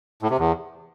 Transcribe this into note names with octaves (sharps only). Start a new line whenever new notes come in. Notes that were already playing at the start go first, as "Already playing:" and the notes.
A2
C3
E2